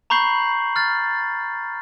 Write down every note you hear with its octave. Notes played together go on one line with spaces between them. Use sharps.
A#5 B5 C#6 G6 C7 F#7
F6 A6